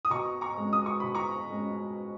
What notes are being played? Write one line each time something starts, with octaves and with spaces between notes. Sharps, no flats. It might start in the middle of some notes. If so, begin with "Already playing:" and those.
D#6
B2 A#5 C#6
A#5 C#6
G#3 C#4
D#6
C#6
B2 B5
A#5 C#6
G#3 C#4